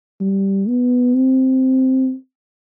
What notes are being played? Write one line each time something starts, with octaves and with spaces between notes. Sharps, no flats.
G3
B3
C4